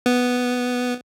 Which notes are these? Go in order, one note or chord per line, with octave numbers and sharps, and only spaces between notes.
B3